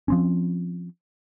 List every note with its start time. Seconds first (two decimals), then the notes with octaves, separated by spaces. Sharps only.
0.08 F3 C4 C#4